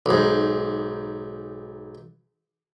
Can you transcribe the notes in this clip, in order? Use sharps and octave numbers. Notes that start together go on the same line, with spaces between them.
B1 G#2